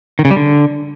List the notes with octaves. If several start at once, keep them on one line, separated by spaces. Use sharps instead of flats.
D#3
C#3
G3
D3